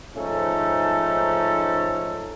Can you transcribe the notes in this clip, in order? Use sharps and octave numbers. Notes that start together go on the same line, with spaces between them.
G#2 F3 A3 C#4 D#4 A4